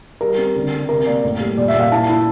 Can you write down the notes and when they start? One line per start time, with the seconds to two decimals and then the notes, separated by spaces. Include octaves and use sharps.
0.21 G3 A#4
0.38 C4
0.55 D3
0.73 D3
0.89 C3 A#4
1.06 A#3 D5
1.24 A2
1.40 G3
1.58 A#2 D5
1.68 E5
1.74 A#2
1.80 F5
1.92 E4 A5
2.09 E4